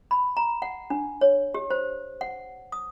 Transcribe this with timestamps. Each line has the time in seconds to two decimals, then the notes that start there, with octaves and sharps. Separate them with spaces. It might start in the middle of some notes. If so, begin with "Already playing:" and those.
0.11 B5
0.37 A#5
0.62 F#5
0.90 D4
1.21 C#5
1.54 G4
1.70 C5
2.21 F#5
2.72 D#6